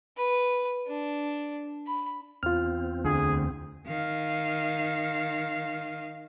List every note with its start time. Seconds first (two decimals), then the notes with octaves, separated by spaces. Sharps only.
0.17 B4
0.87 D4
1.87 B5
2.43 E2 C4 F4 F6
3.05 D2 D3 D4 G#4
3.86 D#3 F5